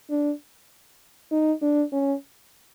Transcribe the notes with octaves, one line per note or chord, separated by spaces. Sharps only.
D4
D#4
D4
C#4